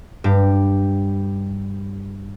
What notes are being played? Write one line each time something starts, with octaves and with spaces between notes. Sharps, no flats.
G2 G4